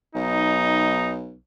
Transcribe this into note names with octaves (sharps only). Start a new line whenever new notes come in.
B1 D#4